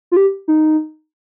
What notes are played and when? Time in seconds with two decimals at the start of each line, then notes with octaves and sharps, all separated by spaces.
0.12 F4
0.16 G4
0.48 D#4